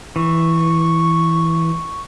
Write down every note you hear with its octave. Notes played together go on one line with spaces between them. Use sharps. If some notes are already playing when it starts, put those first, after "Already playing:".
E3 C#6